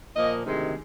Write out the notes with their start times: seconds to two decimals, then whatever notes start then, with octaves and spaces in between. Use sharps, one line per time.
0.16 A#2 F3 A#3 D#5
0.45 D2 C3 D#3 G#3